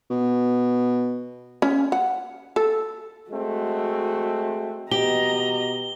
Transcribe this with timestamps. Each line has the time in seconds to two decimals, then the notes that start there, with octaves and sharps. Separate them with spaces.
0.10 B2
1.62 C#4
1.92 F#5
2.56 A4
3.30 G#3 A3 C4 F#4
4.91 B2 G4 D#5 A#5 G7